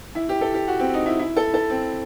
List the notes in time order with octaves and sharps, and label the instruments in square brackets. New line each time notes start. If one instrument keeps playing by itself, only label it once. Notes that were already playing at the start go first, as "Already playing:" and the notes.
[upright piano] E4
G4
A4
G4
F#4
C4
D#4
E4
E4
A4
A4
C4